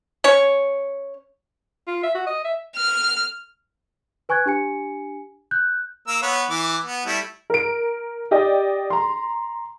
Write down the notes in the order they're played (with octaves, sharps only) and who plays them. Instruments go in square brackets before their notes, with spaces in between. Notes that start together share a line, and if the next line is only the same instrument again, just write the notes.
[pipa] C#4 C#5
[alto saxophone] F4
E5
F#4
D#5
E5
[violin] F6
[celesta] B4 G#5 C#6 F#6 G#6
D4 G4 G#5 C#7
F#6 G6
[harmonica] A#3 A#4 E6
B3 B4 C#5
E3 D6
B3
G3 A3 E4
[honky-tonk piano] A#4 D7
G4 D5 D#5 G5
A#5 C6